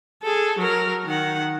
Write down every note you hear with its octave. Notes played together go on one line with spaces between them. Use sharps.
G#4 A4
F#3 A#4
D#3 F#5